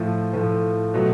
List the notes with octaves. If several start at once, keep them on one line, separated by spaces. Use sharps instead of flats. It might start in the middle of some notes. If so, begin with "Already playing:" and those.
Already playing: A2 F3 A3
A2 F3 A3
B2 F#3 A3